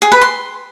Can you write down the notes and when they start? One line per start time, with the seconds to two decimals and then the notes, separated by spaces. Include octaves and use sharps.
0.02 G#4
0.12 B4
0.21 C6